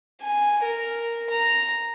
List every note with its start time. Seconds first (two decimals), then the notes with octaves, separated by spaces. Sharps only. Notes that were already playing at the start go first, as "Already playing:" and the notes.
0.22 G#5
0.64 A#4
1.30 A#5